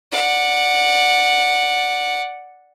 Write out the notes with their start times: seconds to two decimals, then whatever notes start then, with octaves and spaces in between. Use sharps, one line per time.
0.12 D5 F#5